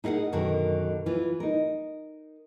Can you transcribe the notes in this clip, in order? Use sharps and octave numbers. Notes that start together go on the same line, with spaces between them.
D#4 E4 G#4 A#4 F#5
F#2 B2 D3 D#3 F#4 A#4
E3 F4
D#4 A#4